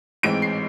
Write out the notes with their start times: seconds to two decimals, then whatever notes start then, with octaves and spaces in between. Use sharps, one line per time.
0.23 A1 G#2 E3 G#3 C4 D7
0.42 C7